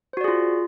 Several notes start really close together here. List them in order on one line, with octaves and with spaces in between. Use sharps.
C5 F#4 D5 G#4 F4